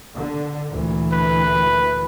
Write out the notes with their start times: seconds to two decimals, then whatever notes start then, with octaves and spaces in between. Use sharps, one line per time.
0.15 D3
0.70 D2 A#2 E3
1.12 B4